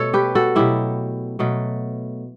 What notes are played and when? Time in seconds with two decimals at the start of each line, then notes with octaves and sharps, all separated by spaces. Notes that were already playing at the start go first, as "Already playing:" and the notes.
Already playing: B2 A3 A4 C#5
0.14 G4 B4
0.35 F#4 A4
0.55 B2 F#3 A3 E4 G4
1.39 B2 F#3 A3